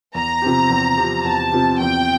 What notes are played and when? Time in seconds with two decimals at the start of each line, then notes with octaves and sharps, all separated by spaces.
0.15 E2 A#5
0.42 C3 F3 C4 G4
0.70 E2
0.97 C3 F3 C4 G4
1.24 E2 A5
1.52 C3 F3 C4 G4
1.80 E2 G5